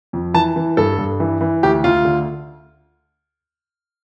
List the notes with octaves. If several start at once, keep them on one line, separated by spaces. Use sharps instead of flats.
F2
E3 A5
E3
G2 A4
G2
E3
E3
D2 G4
D2 F4
D3